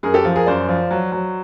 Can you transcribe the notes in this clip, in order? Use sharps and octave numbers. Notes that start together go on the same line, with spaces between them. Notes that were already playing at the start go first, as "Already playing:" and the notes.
F#2 G#4 A#4
G4 A4
F3
G#4 A#4
F#2 C5 D5
F3
F#3
F#3